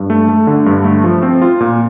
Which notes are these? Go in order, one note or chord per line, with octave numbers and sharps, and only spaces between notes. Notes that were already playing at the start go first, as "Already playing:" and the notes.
Already playing: G2
A3
A3
D3
G2
A3
F3
C4
F4
A#2